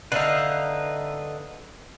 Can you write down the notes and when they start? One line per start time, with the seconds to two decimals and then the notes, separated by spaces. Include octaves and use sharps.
0.12 D3 D#4 B4 E5 F5